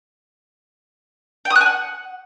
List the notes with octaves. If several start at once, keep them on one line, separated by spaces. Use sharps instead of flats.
G5
D#6
F#6
G#5
F#5